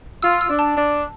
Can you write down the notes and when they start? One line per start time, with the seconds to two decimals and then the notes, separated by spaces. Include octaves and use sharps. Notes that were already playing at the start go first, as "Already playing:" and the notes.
0.23 F4 E6
0.41 E6
0.50 D4
0.59 A5
0.77 D4